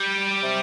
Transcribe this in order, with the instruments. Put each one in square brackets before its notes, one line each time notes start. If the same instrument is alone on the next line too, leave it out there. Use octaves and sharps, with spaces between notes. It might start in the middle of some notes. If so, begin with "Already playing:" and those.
Already playing: [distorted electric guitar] G3
[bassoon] C3